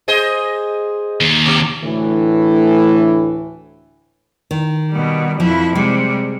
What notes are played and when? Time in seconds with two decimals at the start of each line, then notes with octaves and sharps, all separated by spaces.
0.08 G#4 C5 D#5
1.21 D#2
1.46 B2
1.83 D2 A2 E3
4.51 D#3
4.91 B2 G3
5.40 F2 F3 E4
5.75 C3 G3 G#3